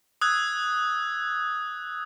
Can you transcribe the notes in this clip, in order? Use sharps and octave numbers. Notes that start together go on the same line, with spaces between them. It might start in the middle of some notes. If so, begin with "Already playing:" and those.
D#6 E6 F#6 G#6